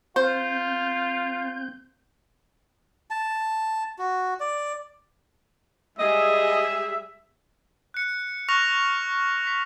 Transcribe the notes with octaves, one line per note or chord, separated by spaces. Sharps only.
C4 F4 C5 G6
A5
F#4
D5
G3 G#3 G#4 D#5 E5
F#6 C#7
C#6 F6 F#6 A#6 F7
B6